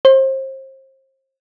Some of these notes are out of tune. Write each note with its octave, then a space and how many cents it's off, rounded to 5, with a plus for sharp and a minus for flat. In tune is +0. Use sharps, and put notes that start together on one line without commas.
C5 +35